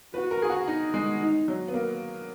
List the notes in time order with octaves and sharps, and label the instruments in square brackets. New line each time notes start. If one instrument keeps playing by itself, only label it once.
[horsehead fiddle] F#4 [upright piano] B4
[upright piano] A#4
G#4
F#4
D#4
G#3
[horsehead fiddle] D#4
[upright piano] F#3
B3
A#3